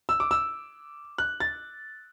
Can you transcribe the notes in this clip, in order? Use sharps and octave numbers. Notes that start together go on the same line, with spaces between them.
E6
D6
E6
F#6
A6